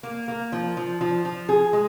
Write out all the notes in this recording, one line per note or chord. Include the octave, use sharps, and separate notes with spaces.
A#3
A#3
F3
F3
F3
F3
G#4
G#3